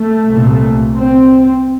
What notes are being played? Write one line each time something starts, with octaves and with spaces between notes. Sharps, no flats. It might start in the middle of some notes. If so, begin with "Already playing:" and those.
Already playing: A3
C2 A#2
C4